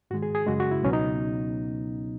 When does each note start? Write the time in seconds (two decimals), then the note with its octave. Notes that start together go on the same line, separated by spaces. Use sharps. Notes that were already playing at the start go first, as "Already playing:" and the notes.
0.11 G#2 D#3 G#3 F#4
0.22 G#4
0.35 G#4
0.47 F#2 C#3 G#3 F#4
0.60 F#4
0.71 E4
0.83 C#2 B2 F#3 B3 C#4
0.93 D#4